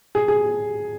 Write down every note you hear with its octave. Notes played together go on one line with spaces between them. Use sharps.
G#4
G#4